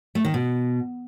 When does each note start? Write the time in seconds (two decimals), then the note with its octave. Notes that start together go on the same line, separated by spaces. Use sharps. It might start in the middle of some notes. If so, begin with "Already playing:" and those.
0.15 A3
0.25 D#3
0.34 B2